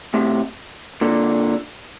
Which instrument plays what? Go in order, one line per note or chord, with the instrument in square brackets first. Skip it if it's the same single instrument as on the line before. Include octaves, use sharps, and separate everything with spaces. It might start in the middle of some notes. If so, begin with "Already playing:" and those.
[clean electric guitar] A2 C3
A#2 D3